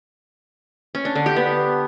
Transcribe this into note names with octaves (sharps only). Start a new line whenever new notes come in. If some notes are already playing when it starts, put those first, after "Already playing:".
C#4
D4
D3
G4
B3